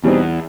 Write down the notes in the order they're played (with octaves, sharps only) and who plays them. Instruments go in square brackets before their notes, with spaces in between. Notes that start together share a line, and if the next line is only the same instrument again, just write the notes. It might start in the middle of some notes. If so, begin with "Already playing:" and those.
[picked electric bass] E2 [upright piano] B2 G3 C4 D#4